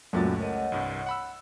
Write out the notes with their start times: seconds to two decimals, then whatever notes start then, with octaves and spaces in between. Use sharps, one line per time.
0.13 C#2 F#2 A#2 F#3 A3 A#3 F#4 A6
0.40 A#4 C#5 D#5 F#5
0.72 C2 G2
1.06 F#5 B5 E6